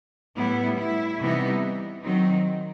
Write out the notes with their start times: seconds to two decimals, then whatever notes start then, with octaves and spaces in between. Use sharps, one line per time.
0.37 A2 G3 B3 E4
0.78 E4
1.20 C3 E3 G3 B3 D#4
2.03 D#3 F#3 C4 D#4